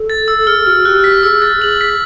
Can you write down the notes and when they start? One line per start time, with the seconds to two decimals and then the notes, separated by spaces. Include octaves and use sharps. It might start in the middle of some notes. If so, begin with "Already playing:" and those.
Already playing: A4
0.10 A6
0.28 E6
0.38 A4
0.47 G#4 F6
0.67 F#4 F6
0.85 G4 F#6
1.04 B6
1.23 G#4 E6
1.42 A6
1.61 G#4 F#7
1.81 B6